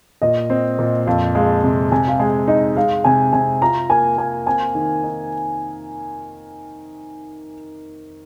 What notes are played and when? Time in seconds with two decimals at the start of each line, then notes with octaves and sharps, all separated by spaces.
0.22 A#2 D#5
0.50 C4
0.79 A#2
1.07 F2 F5
1.35 G#3 F5
1.64 C3
1.92 C3 G#5
2.08 F5
2.19 G#3 G#5
2.48 D#4 D#5
2.76 G#3 F5
3.04 C3 G#5
3.33 C3 G#5
3.62 F4 A#5
3.90 A#3 G#5
4.17 A#3 G#5
4.46 C4 G#5
4.75 D#3
5.03 D#4